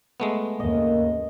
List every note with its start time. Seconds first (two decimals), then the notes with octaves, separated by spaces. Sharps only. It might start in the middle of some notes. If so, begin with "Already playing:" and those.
0.20 G#3 A3 B3
0.60 D#2 G#2 C#3 A#3 D#5